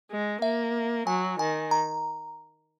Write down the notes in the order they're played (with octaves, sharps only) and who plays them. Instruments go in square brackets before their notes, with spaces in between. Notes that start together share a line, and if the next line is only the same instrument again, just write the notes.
[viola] G#3
[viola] A#3 [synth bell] E5
[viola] F#3 [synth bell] G#5
[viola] D#3 [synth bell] G#5
[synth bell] A#5